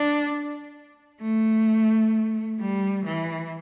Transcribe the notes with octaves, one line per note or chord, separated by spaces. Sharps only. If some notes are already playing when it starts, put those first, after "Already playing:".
Already playing: D4
A3
G3
E3